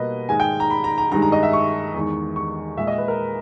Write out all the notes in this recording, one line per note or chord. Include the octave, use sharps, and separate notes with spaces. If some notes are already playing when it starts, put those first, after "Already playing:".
Already playing: B2 G3 A#3 B4 D#5
G#2 D#3 G#3 G#5
G5
A#5
B5
A#5
A#5
G2 D#3 G#3 A#5
A#5
D#5
E5
C#6
E2 D#3 G#3
C#6
A#2 G#3 E5
D#5
B4
A#4